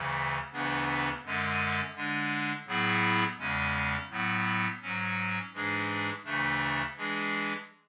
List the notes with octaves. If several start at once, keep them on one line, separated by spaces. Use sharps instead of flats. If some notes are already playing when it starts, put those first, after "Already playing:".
Already playing: D2 C#3 E3
D2 C#3 E3 B3 D4
F#2 D3 G#3 C#4
D3 G#3 D4
A2 F#3 B3 E4 G#4
E2 C#3 G#3 C#4
A2 F#3 B3
G#2 F#3 C#4
G#2 E3 G#3 D4 G#4
D2 C#3 E3 A3 D4
E3 G#3 D4 G#4